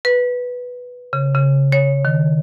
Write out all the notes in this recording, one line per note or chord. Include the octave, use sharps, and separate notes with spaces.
B4
C#3
C#3
C#5
D#3